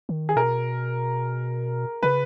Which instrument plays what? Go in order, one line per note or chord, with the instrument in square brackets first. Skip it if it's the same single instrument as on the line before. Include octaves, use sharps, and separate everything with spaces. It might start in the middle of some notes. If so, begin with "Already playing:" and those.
[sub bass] D#3
[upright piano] G#4
[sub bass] B2 [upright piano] A#4
[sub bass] C#3 [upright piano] B4